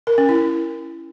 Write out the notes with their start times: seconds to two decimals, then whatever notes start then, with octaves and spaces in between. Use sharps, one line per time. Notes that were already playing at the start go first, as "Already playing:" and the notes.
0.07 A#4
0.18 C#4
0.29 E4